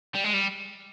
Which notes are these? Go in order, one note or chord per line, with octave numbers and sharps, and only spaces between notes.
G3
G#3
G3